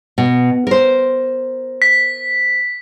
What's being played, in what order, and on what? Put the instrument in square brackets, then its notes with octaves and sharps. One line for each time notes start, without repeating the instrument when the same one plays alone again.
[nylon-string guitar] B2
A#4 C5
[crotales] B6